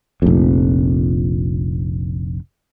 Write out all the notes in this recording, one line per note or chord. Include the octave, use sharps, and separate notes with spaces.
F1 A#1 F2